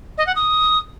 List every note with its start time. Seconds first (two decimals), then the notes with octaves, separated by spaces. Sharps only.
0.18 D#5
0.26 F#5
0.35 D#6